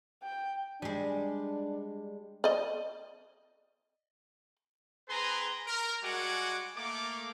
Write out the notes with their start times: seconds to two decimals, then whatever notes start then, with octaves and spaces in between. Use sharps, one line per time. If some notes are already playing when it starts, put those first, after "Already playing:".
0.23 G5
0.82 G3 G#3 D4
2.44 D5 D#5
5.09 C4 G#4 B4 G#5 A#5 C6
5.67 A#4
6.03 G3 G#3 F#4 F#5 G#5 D6
6.77 A3 A#3 D6